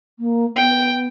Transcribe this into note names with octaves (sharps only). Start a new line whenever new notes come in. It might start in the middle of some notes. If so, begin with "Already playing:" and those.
A#3
B3 G5